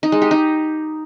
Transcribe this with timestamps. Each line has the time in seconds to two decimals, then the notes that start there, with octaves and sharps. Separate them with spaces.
0.03 D#4
0.12 G#3
0.22 G4
0.31 D#4